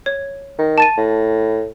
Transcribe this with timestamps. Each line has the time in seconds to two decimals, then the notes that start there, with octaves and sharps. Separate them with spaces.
0.06 C#5
0.58 D#3
0.78 A5 A6 D#7
0.97 A2